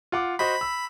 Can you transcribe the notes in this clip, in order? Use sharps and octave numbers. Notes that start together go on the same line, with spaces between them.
F4 F#5 D6
F#4 C5 D#5 B5
E6